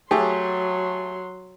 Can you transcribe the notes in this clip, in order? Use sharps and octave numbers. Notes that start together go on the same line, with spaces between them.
F#3 A3 G4 G#4 C6